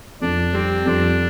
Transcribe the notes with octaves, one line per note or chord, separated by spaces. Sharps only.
F2 D4
G3 C4
F2 D4